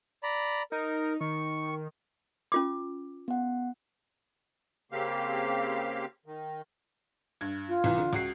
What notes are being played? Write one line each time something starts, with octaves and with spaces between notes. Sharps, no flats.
D5 A#5 B5
D#4 A#4
D#3 C#6
C#4 F4 D6
B3 F#5
C#3 A#3 C4 G4 F5
D#3
G2 G#6
F4
C2 E3
D3
C#2 F#4 C7